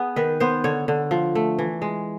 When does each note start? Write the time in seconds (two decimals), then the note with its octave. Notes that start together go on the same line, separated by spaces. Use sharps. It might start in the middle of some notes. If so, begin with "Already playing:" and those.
Already playing: B3 G#4
0.16 D#3 B4
0.40 B3 C5
0.64 D3 C#5
0.88 D3
1.11 F3
1.35 A3
1.59 E3
1.82 G#3